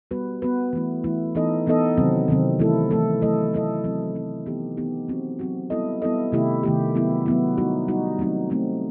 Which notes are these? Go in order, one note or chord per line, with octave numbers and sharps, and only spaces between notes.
G3 B3 F#4 B4
G3 B3 F#4 B4
E3 A3 E4
E3 A3 E4
E3 B3 D#4 A4 D#5
E3 B3 D#4 A4 D#5
C3 D#3 F#3 C4
C3 D#3 F#3 C4
E3 A3 E4 A4
E3 A3 E4 A4
F#3 A3 E4 A4 D#5
F#3 A3 E4 A4 D#5
F#3 C4 E4
F#3 C4 E4
E3 B3 D#4 G4
E3 B3 D#4 G4
F#3 C4 F#4
F#3 C4 F#4
G3 B3 E4 A4 D#5
G3 B3 E4 A4 D#5
C3 D#3 A3 E4 G4
C3 D#3 A3 E4 G4
F#3 B3 E4
F#3 B3 E4
G3 D#4 F#4
G3 D#4 F#4
F#3 A3 C4 D#4
F#3 A3 C4 D#4